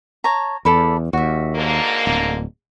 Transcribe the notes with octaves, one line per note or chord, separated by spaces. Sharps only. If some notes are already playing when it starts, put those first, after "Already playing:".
C#5 A5 A#5
E2 A4 D5 B5
D#2 F#4 E5
G#2 D3 A#3
D1